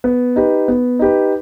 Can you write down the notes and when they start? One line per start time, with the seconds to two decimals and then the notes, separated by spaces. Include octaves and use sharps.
0.04 B3
0.36 D#4 G4 B4
0.68 B3
0.99 D#4 G4 B4